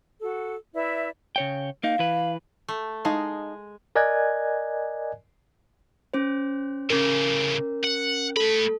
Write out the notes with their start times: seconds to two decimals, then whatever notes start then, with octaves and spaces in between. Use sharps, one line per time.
0.22 F#4 A4
0.75 E4 B4 D5 E5
1.36 C#3 C#5 G5
1.83 A#3 D#4 F5
1.99 E3 B4
2.68 A3
3.05 G#3 D#4 F5 A5
3.95 A#4 D5 D#5 G#5 F#6 G#6
6.14 C#4 C5
6.90 A2 C#3 C#4 A#4
7.84 F#5
8.37 A3 A4 B5